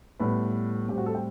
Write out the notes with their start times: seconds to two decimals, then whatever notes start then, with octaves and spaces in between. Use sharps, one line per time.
0.19 A2 G3 B3 B4
0.88 A2 G3 C4 G4
0.98 F#4
1.06 A4
1.15 G5